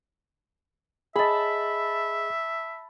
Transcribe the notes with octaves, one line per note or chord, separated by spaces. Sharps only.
G#4 D#5 E5 A5 B5